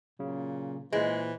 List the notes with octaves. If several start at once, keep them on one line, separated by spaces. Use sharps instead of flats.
A#2 C#3 F#3
A#2 E3 G#3 C5